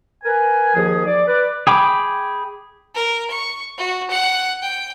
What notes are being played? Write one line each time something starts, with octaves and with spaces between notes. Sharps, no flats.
A#4 B4 G#5
D#2 F3 G#4
D5
B4 D5
G#4 G5 B5 D6
A#4
C#6
F#4
F#5
G5